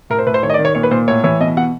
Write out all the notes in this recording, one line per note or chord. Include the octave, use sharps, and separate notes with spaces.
A2 A#4
C5
A2 B4
C5
D#3 C#5
D#5
D5
D#3
C#5
A#2 C#5
B4
A#2 C5
A2 C#5
E3 C#5
B2 D#5
B2 F#5